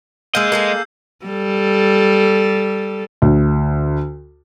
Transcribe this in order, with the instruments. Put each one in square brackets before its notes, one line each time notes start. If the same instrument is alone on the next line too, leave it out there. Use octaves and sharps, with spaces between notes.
[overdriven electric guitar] G#3 D#5 [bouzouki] A#3 G#4 [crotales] E6 G6
[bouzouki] A#3 G#4 A4 [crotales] C7
[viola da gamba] G3 A4
[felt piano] D2